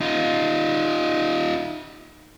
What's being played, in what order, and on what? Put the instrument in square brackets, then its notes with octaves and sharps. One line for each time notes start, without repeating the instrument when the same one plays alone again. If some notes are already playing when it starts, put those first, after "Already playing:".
[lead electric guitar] D#4 F4